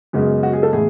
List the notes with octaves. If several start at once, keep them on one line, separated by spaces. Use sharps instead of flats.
F#2 C#3 G#3 B3
F#4
G#4
A4
A2 E3 B3 G#4